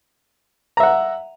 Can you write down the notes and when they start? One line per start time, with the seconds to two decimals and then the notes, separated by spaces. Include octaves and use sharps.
0.77 A#5
0.80 E5
0.83 F#5